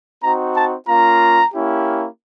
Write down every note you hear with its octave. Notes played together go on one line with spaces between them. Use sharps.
C4 D#4 F#4 A#5
A5
A#3 C#4 F4 A#5
A#3 C#4 E4 G4